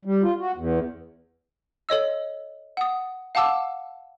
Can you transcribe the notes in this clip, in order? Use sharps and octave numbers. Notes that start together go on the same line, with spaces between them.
G3
F4
F#4
E2
A4 C#5 D#5 E6
F#5 D#6
F5 F#5 A5 D6 E6